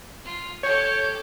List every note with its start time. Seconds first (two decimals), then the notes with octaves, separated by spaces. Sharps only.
0.24 F4
0.63 G4 A4 C#5 G6